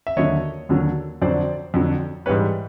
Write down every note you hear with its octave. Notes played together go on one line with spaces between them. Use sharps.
E5
D#2 D3 F#3 C#5 D#5
D#2 D3 F#3
F2 D3 F#3 C5 D5
F2 D3 F#3
G#2 E3 G3 B4 C#5